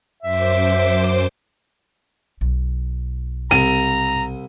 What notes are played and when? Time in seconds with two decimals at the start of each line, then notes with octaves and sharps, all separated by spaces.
0.22 F#2 C5 E5 D6
2.41 B1
3.51 C2 A#5 D#7